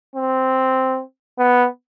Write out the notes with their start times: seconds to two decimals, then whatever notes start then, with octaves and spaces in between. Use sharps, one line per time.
0.16 C4
1.38 B3